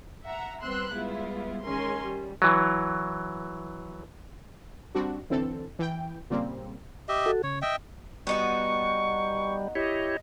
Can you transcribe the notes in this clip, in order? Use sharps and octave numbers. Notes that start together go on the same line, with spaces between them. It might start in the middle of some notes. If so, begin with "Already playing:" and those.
E5 F#5 A#5
G3 B3 C4 C6 E6 F#6
G3 G#3 B3 E4 F4
D#3 G#3 C#4 A#4 G#5 C6
G3
E3 F#3
G3 C4 D4 F#4
B1 D3 E3 C4 A4
E3 G5
A#2 C#3 G3 A#3 C4
G4 D#5 E5
F#4 A4
C#3 C#5
D#5 E5 G5
G3 B3 D#4 F#4 C#6
E4 G4 C#5 D#5